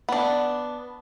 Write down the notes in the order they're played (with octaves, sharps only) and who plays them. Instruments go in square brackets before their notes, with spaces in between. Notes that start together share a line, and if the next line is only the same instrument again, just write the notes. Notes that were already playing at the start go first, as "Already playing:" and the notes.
[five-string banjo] B3 D4